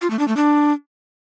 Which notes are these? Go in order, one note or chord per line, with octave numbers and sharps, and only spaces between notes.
F4
A3
D4
A3
D4